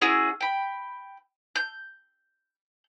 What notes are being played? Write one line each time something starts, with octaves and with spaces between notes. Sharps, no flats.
C#4 E4 F#4 G#4
G5 B5
G6